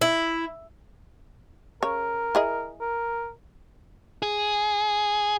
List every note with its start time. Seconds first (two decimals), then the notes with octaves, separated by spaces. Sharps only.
0.01 E4
1.83 C#3 A#4 C#5
2.35 E4 G#4 D#5
2.81 A#4
4.22 G#4